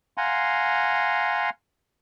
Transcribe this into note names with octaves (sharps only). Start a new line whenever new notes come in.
F5 F#5 G#5 A#5 C6